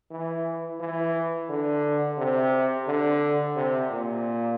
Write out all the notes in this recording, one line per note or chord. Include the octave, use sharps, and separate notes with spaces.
E3
E3
D3
C3
D3
C3
A#2